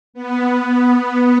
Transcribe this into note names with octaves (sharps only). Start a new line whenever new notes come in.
B3